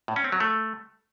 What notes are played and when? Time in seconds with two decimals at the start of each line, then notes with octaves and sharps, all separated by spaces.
0.08 A2
0.16 C#4
0.24 C4
0.32 F#3
0.40 A3